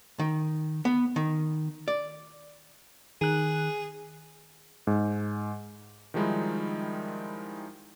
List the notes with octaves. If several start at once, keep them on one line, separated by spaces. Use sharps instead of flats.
D#3
B3
D#3
D5
D#3 G#4 F#6
G#2
D#3 F3 G3 G#3 D#4 E4